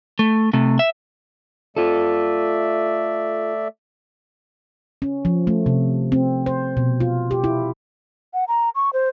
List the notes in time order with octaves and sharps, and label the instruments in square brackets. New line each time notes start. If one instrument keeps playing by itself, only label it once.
[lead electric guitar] A3
C3 A3
E5
[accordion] A3 D5 E5 [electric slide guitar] F4 A4
[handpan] C#4
F3
A3
C3
C4
C5
B2
F4
G4
E4
[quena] F#5
A#5
C#6
C5